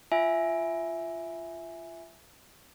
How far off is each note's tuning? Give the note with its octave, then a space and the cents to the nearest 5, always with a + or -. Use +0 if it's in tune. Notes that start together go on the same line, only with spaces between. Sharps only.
F4 -15 E5 +0 G#5 +0